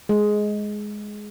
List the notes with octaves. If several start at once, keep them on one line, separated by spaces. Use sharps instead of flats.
G#3